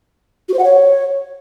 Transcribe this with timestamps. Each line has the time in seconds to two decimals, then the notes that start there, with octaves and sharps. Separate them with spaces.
0.49 F#4
0.54 C5
0.59 F#5
0.64 C#5